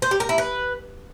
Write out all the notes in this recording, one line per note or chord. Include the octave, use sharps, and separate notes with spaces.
C5
G4
A#4
E4
B4